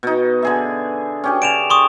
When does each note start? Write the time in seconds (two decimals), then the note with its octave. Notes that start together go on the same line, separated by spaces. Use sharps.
0.03 B2 D#4
0.42 D3 G#4 E5
1.24 C#4 G4 G#4
1.42 D3 D7 E7 F7
1.70 C6 C#6 D#6